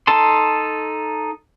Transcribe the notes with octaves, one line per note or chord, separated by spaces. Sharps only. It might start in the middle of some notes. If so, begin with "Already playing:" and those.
D#4 A4 A5 C6